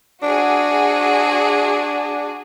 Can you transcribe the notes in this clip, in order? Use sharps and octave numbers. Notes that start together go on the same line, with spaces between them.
D4 F#4 G#4